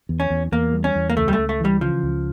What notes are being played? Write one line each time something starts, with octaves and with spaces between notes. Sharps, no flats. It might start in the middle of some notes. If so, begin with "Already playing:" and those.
E2
C#4
E2
E2 A#3
G3
C#4
E2
A#3
C#2 A3
G3
A3
C#2
A3
E3 G3
C#3 F3
C#2